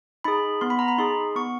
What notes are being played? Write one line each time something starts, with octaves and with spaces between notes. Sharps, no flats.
D#4 G#4 B5
B3 C6
B5
A#5
B5
D#4 G#4 C6
B3 C#6